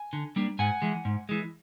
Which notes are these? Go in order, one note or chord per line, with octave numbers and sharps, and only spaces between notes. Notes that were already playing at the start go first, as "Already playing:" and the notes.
Already playing: G#5
D3
G3 A#3 D4
G#2 F#5 G#5
E3 G#3
G#2
E3 G#3